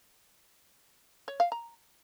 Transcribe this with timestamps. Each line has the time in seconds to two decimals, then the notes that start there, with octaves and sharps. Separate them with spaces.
1.28 C#5
1.40 F5
1.52 A#5